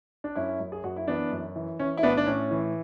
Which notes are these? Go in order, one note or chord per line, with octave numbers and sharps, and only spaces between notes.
D4
F#2 C#4 E4
F#2
G#4
F#2 F#4
E4
E3 B3 D4
F#2
E3
E3 C#4
E4
A2 B3 D4
D4
A2 C#4
E3